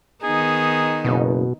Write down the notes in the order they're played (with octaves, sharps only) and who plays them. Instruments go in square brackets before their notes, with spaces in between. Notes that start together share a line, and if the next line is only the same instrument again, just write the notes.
[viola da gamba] D#3 B3 D#4 [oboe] G#4
[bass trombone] F#1 [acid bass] B2